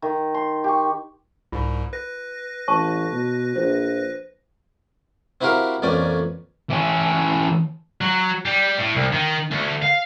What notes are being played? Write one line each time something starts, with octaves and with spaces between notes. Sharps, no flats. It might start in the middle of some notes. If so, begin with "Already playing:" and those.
D#3
C6
G4 C#6
C2 G#2 F4
B4 A#6
A1 C#5 A5 C#6
B2
A#1 C5
C4 E4 F#4 G4 A#4 F5
A1 F2 A#2 C#4 D5 G#5
E3 C#4
F#3
G3
A2
C2
D#3
D2
F5